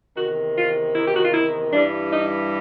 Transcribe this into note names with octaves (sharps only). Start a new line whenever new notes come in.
E2 C3 D#3 F#4
F4
E4
G4
F#4
F4
E4
G2 E3 G3 D4
D#4